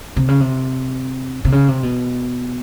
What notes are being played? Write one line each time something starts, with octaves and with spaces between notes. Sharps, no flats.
C3
C#3
C3
C3
C#3
C3
B2